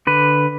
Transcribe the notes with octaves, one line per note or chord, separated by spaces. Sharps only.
D3 B4